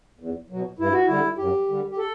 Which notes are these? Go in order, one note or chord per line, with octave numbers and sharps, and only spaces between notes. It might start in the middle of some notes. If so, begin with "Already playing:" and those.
E2
B2 F#3
G2 E4
F#4
D3 G3 E4
F#2 G4
D3 G3
G4
A4